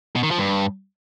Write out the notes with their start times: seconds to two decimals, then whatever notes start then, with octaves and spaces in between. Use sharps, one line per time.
0.16 B2
0.23 D#3
0.31 F3
0.38 G2